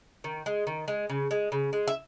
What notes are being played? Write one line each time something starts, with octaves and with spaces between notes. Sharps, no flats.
D#3
G#3
D#3
G#3
C#3
G#3
C#3
G#3
E5